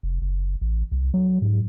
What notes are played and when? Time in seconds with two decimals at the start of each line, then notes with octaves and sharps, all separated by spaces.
0.03 F1
0.22 F#1
0.61 A1
0.92 C2
1.14 F#3
1.42 G#2